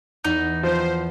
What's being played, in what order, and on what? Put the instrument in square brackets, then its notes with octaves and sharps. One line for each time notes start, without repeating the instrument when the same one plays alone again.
[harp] E2 [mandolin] D#4
[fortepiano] F3 [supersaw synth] C5